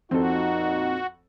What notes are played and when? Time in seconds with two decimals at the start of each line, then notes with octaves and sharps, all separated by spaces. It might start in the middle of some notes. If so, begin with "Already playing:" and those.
0.11 F2 A#2 C4 D#4 F#4 A4